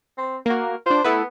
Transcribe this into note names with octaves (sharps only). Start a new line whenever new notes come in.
C4
A#3 F#4 A#4
D4 F4 C5
A3 B3 E4 B4